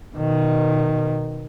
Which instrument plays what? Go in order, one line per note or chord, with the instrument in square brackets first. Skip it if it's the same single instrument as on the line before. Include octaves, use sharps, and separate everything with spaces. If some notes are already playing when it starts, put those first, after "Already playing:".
[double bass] B2 D#3